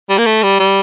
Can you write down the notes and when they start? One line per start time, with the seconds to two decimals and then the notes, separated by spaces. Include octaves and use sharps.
0.09 G3
0.18 A#3
0.26 A3
0.43 G3
0.60 G3